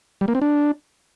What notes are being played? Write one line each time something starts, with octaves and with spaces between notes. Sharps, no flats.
G3
A#3
C4
D4